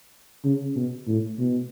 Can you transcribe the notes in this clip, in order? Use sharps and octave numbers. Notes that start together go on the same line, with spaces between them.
C#3
B2
A2
B2